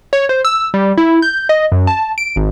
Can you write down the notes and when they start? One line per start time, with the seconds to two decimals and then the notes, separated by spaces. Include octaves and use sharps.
0.13 C#5
0.29 C5
0.45 E6
0.74 G3
0.98 E4
1.22 G6
1.49 D#5
1.72 F#2
1.87 A5
2.18 D7
2.36 G#1